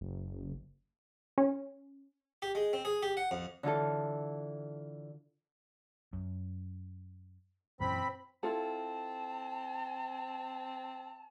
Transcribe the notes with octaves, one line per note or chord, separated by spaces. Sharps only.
F#1
C#4
G4
G#3
C4
G#4
G4
F#5
F2
D3 E3 F4 A4
F#2
F#2 A#2 E3 C4 B5
C4 E4 F4 A4 A5